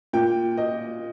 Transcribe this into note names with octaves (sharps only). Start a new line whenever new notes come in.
A#2 G5
D#5